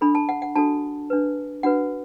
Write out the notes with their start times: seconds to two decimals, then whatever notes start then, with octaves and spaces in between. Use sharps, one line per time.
0.01 D4 A4 B5
0.15 A5
0.29 F#5
0.42 F#5
0.55 D4 F#4 A4 A5
1.10 D4 B4
1.63 D4 F#4 B4 F#5